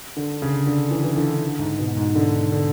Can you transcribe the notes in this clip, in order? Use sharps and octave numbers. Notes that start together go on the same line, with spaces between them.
D3
C#3
D3
E3
E3
D3
G#2
B2
G#2
D3
D3